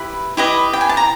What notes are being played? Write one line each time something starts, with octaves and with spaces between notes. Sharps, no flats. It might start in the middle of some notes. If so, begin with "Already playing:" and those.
Already playing: E4 G4 B4
E4 G4 B4 D#5
G5
G#5
A5
A#5